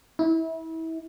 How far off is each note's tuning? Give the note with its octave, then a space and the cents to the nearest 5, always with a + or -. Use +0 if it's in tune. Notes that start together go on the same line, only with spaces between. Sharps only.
E4 -30